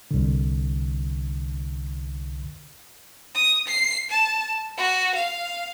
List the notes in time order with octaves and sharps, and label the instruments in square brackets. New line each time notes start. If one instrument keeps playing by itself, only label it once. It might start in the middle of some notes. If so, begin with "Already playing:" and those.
[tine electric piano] C2 D3
[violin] D#6
C7
A5
F#4
F5